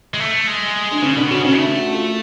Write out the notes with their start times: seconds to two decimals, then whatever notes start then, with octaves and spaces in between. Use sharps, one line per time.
0.14 G#3
0.20 A3
0.47 G#3
0.91 D4
1.02 C#3 C#4
1.16 B2 D4
1.31 C#3 F#4
1.44 C#3 C#4
1.58 A3 D4
1.76 F#4
1.95 F4